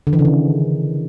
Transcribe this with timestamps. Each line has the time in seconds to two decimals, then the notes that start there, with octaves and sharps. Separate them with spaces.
0.07 D3
0.13 E3
0.19 C#3
0.25 D#3